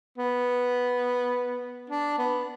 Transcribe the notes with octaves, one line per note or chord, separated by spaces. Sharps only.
B3
D4
B3